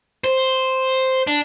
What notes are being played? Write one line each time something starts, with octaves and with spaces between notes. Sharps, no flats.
C5
D4